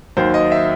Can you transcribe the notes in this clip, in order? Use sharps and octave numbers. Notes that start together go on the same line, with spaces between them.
D#2 D#3 F#3 C5
D#5
E5